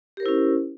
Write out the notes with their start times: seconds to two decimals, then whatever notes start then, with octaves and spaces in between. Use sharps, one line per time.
0.17 G4
0.20 A#4
0.23 C5
0.26 E4
0.28 C#4